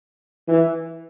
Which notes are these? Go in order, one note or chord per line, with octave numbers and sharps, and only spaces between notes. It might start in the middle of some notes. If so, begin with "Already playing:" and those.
E3